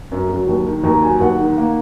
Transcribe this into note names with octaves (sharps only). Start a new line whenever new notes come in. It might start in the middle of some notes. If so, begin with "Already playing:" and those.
F#2
F#3
D#2
D#3
D#2 A#5
F#3 G#5
D#2 F#5
D#3
A#3